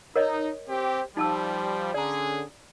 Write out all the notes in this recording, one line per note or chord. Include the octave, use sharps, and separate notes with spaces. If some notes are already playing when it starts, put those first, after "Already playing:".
D#4 A#4 C#5 D#5
C4 G4
F3 G3 D#4 A5 E6
D3 C#4 G#4 D5 A#5